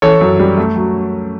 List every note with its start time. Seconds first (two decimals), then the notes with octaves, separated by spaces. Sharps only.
0.02 E3 A4 C#5
0.21 F#2
0.39 G3
0.57 A3
0.76 F#3